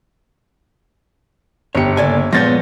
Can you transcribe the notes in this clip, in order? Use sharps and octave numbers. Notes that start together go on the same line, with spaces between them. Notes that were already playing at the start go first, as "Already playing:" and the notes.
G1 G4 C#5 C#7
C#3 A#3 A4 D5 G#5
A#2 F3 G#3 B3 C#5 G6 A6 A#6